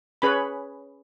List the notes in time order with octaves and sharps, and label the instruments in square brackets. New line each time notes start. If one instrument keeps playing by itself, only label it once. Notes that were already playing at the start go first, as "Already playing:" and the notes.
[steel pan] C#4 G#4 B4 C#5 B5